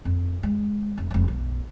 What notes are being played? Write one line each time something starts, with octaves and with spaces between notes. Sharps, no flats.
F2
G#3
F1
F1 F3
B1